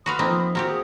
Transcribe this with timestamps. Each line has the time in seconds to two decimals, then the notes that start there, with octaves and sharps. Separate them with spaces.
0.06 F#4 B4 F5 B5 C6 D#6
0.19 F3 A#3 C4 D#4
0.55 A#3 C4 F#4 G4
0.68 G#4 D#6